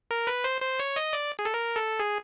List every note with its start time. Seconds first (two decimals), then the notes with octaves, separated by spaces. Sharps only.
0.11 A#4
0.27 B4
0.44 C5
0.61 C5
0.80 C#5
0.96 D#5
1.13 D5
1.39 G#4
1.45 A4
1.54 A#4
1.76 A4
1.99 G#4